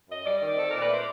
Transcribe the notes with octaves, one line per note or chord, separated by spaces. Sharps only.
F#2 D#5
G3 D5
D#3
C4 A4
A#2 A#4
B4
A3 C5